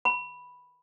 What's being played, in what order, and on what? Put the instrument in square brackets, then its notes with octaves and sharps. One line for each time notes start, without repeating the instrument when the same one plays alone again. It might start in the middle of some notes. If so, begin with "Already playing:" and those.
[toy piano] B5